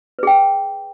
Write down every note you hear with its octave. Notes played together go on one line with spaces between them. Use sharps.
G#4 B4 G5